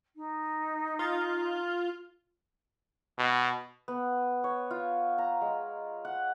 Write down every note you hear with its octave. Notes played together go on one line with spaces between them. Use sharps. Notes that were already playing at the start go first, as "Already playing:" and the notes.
D#4
F4
B2
B3
C#5
F4
A#5
G#3
F#5